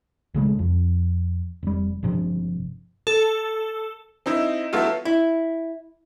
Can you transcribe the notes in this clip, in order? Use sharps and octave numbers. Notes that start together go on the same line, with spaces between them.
B1 C#3 G#3 A3
F2 F3
F1 G3
G1 G2 C3 F3
A4
C4 D#4 E4
F#3 A3 B3 E4 F4
E4